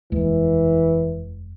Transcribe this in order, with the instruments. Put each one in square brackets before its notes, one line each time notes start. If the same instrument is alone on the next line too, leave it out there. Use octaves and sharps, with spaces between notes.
[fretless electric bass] F1 D#2 G#3 [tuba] E3